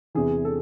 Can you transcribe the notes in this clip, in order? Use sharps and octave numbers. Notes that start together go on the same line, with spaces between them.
E2 C3 E3 G#4
A4